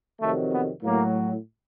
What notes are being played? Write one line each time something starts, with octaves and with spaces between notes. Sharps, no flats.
F2 C3 D#3 F#3 A3
B3
A2 F#3 A#3